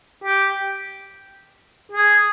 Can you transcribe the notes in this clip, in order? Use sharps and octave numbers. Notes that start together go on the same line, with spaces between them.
G4
G#4